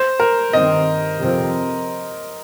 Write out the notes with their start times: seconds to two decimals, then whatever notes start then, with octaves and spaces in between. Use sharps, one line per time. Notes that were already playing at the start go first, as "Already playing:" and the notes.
Already playing: C5
0.20 A#4
0.52 G2 D#3 C4 D#5
1.19 F2 C3 F3 C4